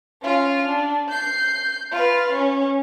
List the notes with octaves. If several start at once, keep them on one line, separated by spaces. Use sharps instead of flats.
C#4 F4
D4
G6 C7
F4 B4
C#4